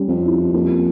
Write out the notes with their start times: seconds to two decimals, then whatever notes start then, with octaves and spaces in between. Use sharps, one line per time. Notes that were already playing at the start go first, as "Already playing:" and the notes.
Already playing: G3 C#4
0.08 F2
0.23 E4
0.53 F2 A#3